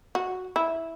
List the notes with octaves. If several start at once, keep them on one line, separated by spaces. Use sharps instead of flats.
F#4
E4